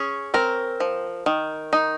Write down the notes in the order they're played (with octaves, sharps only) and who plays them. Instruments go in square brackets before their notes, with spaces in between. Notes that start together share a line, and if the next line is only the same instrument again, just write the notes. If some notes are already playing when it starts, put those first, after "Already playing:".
Already playing: [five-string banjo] C#4 G#4
C4 A#4
F3
D#3
D#4